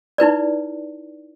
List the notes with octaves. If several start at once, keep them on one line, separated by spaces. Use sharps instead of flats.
D#4 E4 B4 D5